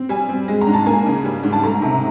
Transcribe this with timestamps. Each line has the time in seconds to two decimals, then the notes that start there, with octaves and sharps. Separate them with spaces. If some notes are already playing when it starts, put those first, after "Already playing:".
Already playing: C4
0.09 G3 G#5
0.29 C4
0.48 G#3
0.61 A#5
0.67 G#2
0.74 A5
0.86 A#3 G#5
1.06 C#3
1.24 G3
1.43 G#2
1.53 A5
1.63 A3 A#5
1.82 C3 A#5